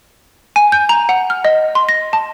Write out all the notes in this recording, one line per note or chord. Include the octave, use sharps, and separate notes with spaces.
G#5
G6
A#5
F#5
F6
D#5
C6
A#6
A5